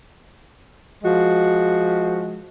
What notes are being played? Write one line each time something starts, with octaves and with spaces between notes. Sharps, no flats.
F3 G#3 F#4